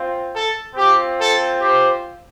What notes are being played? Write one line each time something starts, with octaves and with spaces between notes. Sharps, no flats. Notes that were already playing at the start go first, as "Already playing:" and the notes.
Already playing: C4 F4
A4
C4 F4 G4
A4
G4 C5